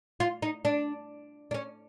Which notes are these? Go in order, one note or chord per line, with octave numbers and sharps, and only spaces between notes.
F4
D#4
D4
D4
C#4